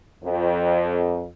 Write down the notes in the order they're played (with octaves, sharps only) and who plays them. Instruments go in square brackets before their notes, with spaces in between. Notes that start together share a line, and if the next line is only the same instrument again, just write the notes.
[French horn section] F2